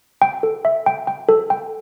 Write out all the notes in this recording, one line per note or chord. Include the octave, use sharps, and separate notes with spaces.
G5
A4
E5
G5
G5
A4
G5